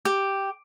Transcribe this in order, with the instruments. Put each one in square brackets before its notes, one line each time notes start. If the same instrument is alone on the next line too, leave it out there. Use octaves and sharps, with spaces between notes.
[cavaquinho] G4